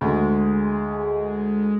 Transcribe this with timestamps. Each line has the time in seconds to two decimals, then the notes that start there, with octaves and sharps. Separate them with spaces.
0.01 D2 G#3